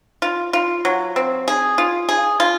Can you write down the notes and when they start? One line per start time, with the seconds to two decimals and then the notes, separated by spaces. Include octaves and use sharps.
0.22 F4
0.53 F4
0.85 F#3
1.16 C4
1.48 G#4
1.78 F4
2.09 G#4
2.40 F4